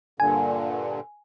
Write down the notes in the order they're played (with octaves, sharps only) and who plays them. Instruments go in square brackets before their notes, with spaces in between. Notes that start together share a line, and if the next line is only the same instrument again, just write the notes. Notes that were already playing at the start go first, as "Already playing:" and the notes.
[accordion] G2 A#2 D3 [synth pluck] G#5